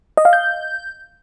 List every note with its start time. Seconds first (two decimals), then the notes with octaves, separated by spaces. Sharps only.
0.17 D#5
0.25 F5
0.33 G6